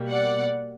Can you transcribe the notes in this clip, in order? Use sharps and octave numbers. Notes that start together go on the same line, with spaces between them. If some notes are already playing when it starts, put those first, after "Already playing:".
Already playing: B2 G3 A#3
D5 F#5